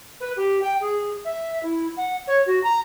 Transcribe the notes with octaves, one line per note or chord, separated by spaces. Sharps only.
B4
G4
G5
G#4
E5
E4
F#5
C#5
F#4
A#5